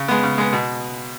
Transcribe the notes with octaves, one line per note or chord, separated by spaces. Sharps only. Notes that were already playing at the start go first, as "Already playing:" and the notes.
Already playing: C#3
G#3 B3
C#3
G#3 B3
B2